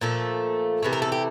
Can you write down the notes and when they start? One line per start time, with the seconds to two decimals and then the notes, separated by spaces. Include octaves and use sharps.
0.01 A#2 F3 A3 A4
0.83 C3 E3 A3
0.93 A#4
1.02 A4
1.12 G4